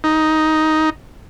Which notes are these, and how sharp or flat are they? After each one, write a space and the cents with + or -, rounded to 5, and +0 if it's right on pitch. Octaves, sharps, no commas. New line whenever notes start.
D#4 +10